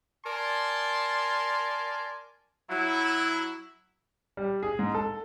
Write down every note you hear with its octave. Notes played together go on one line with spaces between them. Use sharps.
A#4 D5 G#5 A5 C6
F#3 E4
G3
G#4
G#2
A4